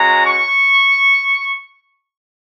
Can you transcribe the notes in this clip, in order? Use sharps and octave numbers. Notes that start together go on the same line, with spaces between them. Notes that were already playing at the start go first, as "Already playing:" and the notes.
Already playing: G#3 C#4 F#4 A#5
C#6